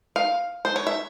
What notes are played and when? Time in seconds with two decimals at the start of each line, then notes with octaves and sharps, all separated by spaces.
0.16 F5
0.65 C5
0.76 C#5
0.87 E5